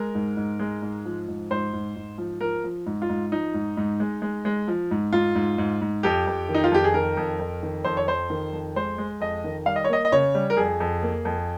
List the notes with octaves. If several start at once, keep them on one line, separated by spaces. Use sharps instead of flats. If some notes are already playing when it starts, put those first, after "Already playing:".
Already playing: G#3 A#4
G#2
G#2
G#3
G#2
F3
G#2
G#2 C5
G#2
G#2
F3
F3 A#4
F3
G#2
F4
G#2
F3 D#4
G#2
G#2
G#3
G#3
G#3
F3
G#2
G#2 F4
G#2
G#2
G#2
F2 G4
F2
D#3
D#4
F4
F2 G4
G#4
D#3 A#4
F2
F2
D#3
F2 C5
C#5
F2 C5
D#3
F2
G#3 C5
G#3
F2 D#5
D#3
G3 F5
D#5
C#5
A#3 D#5
D#5
C#3 C#5
G3
A#4
F2 G#4
F2
A#3
F2